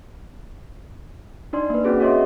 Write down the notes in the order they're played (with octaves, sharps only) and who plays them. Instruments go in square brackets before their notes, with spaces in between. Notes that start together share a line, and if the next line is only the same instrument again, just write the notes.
[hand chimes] D4 D#4 D5 C6
A#3 B4
C4 C#4 F#4 G#4 B4
F#4 G#4 C#5 D#5 E5 C6